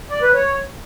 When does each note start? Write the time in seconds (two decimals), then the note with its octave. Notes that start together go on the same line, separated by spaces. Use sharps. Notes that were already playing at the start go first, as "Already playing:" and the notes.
0.10 D5
0.22 B4
0.34 C#5